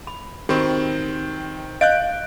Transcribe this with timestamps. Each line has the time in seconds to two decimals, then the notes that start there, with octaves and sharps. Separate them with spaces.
0.07 B5
0.49 D#3 C4 F#4 G4 B5
1.81 D#5 F5 F#6 G6 D7